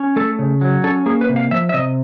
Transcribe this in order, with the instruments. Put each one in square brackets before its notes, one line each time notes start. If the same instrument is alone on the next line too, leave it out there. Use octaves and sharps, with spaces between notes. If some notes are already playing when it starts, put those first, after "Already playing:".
Already playing: [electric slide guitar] C#4
A3 A4
C#3
F#3
C#4 A4
A#3 G#4
B4
C3
F5
F3 E5
E5
C3 D#5